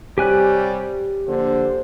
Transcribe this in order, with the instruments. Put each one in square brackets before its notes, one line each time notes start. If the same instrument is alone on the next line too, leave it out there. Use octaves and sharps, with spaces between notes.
[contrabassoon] C3 [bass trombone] G3 [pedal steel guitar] G4 G#5 F#6 [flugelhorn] C#5
[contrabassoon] A#1 [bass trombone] D3 [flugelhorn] C5